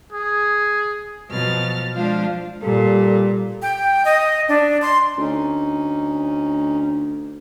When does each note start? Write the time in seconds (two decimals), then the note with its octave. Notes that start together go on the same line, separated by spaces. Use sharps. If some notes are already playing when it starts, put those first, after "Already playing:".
0.13 G#4
1.28 B2 F3 F#3 F6 A6
1.95 F3 G#3 D4 F4 C5 F5
2.63 A#2 G3 A4
3.62 G5
4.05 D#5
4.48 D4
4.82 C6
5.18 D2 C#4 D#4